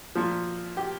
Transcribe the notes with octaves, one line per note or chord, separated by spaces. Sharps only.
A#2 F3
G4